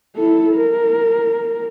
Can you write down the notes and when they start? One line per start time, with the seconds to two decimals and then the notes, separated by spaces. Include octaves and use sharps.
0.16 E4 A4
0.55 A#4